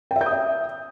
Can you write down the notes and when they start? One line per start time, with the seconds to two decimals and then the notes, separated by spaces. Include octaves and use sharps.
0.11 G5
0.16 E5
0.21 G6
0.26 D#6
0.31 E5